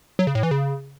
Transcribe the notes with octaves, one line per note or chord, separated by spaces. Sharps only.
F#3
C#3
A2
E3
C#3